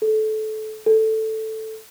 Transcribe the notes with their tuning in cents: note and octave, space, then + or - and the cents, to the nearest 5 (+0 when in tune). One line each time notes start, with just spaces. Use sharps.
A4 -20
A4 +0